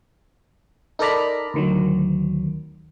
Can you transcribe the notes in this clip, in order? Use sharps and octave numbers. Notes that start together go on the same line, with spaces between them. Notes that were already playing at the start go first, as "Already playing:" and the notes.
D#4 A4 A#4 D5 A#5 B5
D2 D#3 F#3